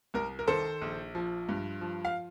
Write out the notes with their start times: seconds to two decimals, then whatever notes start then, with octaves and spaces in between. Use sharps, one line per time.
0.14 C2 A#4
0.39 A#4
0.47 D#3 A4 C5
0.81 A#1
1.15 F3
1.49 G2
1.81 F3
2.05 F5